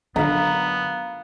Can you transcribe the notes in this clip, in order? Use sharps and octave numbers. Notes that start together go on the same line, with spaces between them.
F#2 D3 B3 F5 A#5